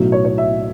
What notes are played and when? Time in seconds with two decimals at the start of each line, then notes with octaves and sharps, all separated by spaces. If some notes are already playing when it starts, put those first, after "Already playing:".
Already playing: B1 A2 F#3
0.12 C#5
0.25 C#5
0.38 E5